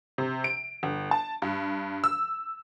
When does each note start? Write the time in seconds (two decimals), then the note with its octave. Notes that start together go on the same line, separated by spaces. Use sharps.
0.18 C3
0.44 D7
0.83 G1
1.11 A5
1.42 G2
2.04 E6